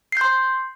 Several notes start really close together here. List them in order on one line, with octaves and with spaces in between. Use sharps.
C7 G6 C6